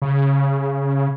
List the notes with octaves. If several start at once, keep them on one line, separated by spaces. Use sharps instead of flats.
C#3